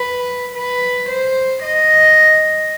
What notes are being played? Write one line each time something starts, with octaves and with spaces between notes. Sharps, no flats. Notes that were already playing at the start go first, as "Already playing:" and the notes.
Already playing: B4
B4
C5
D#5